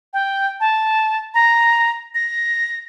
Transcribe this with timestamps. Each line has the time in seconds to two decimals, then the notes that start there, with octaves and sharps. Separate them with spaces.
0.13 G5
0.60 A5
1.34 A#5
2.15 A#6